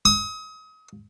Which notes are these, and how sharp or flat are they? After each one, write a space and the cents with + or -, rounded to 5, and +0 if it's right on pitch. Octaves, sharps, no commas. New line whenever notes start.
D#6 +35